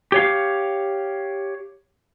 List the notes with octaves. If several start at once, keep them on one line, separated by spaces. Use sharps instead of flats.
G4 C#5 F5